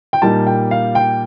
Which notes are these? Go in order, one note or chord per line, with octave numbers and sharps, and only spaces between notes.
G5
A#2 G3 A#3 D#4 A5
G5
F5
G5